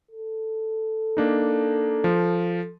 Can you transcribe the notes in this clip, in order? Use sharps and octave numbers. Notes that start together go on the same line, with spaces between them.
A4
A#3 D4 D#4
F3